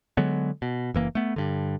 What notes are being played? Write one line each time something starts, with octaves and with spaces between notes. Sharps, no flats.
D3 F#3 G#3 B3
B2
F#1 E3 A#3
A3 B3
G2 D3